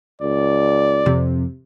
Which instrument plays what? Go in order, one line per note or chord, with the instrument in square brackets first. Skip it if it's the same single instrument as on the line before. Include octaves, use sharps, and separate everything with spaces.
[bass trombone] C#2 [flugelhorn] D5
[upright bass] F2 [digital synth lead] C3